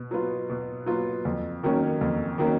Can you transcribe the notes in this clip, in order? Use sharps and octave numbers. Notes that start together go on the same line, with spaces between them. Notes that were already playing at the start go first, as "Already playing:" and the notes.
Already playing: B2
F#3 B3 F4
B2
F#3 B3 F4
F2
D#3 F#3 A#3 C#4
F2
D#3 F#3 A#3 C#4